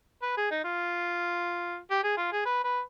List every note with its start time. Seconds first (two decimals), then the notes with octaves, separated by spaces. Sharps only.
0.22 B4
0.37 G#4
0.51 D#4
0.64 F4
1.90 G4
2.03 G#4
2.17 F4
2.32 G#4
2.45 B4
2.64 B4